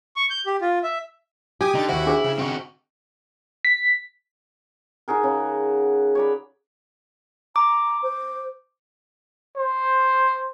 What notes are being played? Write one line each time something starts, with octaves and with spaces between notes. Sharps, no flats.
C#6
G6
G4
F4
E5
G4 G#5 D#6
D3 D#4 A6
D#2 E4 F#4 C5
D4 G#4 C5
C#3
C4 F#4
B6
D#4 F#4 G#4 A#4
C#3
C#5 D5 B5
A#5 D6
C5
C5